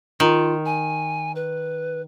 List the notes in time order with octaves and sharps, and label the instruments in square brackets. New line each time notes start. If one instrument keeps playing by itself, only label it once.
[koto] D#3 [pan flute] F4
[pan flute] G#5
B4